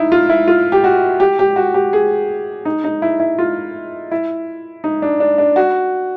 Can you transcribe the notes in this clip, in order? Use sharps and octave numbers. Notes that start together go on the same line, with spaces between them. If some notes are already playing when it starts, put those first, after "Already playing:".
Already playing: D#4 E4
F4
E4
F4
G4
F#4
G4
G4
F#4
G4
G#4
D#4
D#4
E4
E4
F4
E4
D#4
D4
D4
D4
F#4